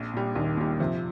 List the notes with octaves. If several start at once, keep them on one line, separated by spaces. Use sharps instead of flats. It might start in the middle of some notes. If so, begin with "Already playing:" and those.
Already playing: A#1
A#2 G3
A#1 D#2 D#3
A#2 G3
F2 C3 F3